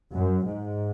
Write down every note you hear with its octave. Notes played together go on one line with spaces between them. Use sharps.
F#2
G#2